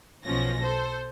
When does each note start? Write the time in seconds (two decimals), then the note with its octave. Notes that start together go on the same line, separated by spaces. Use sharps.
0.25 B1 B2 F3 C#4 A#6
0.62 A4 C5